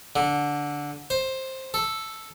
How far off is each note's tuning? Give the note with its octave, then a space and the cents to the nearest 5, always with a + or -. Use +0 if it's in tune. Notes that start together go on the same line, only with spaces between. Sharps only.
D3 -10
C5 +10
A4 +0